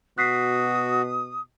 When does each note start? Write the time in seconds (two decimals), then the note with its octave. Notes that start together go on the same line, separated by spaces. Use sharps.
0.18 B2 F#4 D#6 F#6 B6 C7